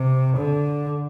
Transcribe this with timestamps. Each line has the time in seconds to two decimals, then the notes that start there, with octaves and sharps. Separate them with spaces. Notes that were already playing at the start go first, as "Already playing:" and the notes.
Already playing: C3
0.37 D3